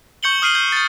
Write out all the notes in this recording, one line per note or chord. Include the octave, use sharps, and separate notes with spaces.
C#6 G6 C#7 F#7 G7
D#6 F6 C7 D#7 F#7 G7
G6
G6 A6